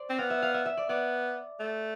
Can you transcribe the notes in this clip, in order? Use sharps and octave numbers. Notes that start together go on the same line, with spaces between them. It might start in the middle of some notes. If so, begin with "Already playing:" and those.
Already playing: C5 D5
C4
B3 F5
E5
F5
E5
E5
D5
B3 D5
A3